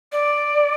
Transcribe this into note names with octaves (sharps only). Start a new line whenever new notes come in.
D5